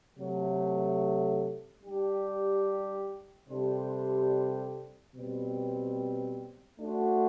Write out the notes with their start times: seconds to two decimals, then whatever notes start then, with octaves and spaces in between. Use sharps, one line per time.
0.16 C3 F#3 A3
1.81 G3 D4 G4
3.47 C3 G3 D4 A4 C5
5.14 B2 G3 C4
6.79 A3 D4 F#4 C5